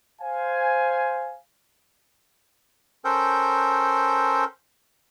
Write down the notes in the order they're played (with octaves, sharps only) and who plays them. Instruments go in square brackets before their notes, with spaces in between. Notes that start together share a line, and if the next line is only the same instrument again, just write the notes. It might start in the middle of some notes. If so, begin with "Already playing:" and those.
[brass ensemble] C5 F5 G#5
[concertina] C#4 A4 A#4 C5 G5